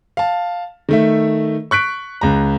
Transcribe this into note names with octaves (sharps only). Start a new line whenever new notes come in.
F5 A5
D#3 A3 E5
C#6 F#6 B6 D7
C#2 A#5